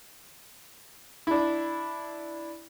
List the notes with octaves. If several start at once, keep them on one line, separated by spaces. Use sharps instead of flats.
D4 E4